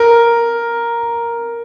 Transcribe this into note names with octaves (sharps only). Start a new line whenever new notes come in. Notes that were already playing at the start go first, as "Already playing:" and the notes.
Already playing: A#4